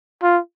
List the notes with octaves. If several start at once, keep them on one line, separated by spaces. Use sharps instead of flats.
F4